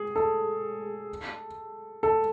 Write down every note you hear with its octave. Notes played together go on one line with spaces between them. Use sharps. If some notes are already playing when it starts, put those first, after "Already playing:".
Already playing: G#4
A4
A4